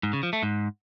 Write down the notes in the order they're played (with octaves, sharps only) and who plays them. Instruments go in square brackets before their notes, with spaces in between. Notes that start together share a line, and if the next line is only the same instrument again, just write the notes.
[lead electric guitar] G#2
C#3
F3
A3
G#2